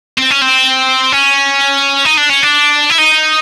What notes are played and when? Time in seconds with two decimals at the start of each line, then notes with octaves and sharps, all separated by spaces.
0.18 C4
0.31 C#4
0.42 C4
1.12 C#4
2.05 D#4
2.17 D4
2.29 C#4
2.43 D4
2.90 E4
2.98 D#4